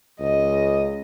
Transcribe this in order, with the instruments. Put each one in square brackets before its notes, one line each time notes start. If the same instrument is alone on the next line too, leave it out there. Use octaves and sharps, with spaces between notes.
[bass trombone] C#2 [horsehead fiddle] D#5